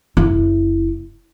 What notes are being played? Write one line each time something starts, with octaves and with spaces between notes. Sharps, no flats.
F#1 E4